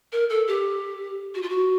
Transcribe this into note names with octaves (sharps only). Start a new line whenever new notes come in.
A#4
A4
G4
F#4
F4
F#4